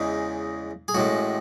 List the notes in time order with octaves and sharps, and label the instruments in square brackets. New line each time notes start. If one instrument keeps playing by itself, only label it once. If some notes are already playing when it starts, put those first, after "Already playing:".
Already playing: [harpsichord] E2 C#3 E3 G#3 D#4
G#4
A1 A2 G#3 F#4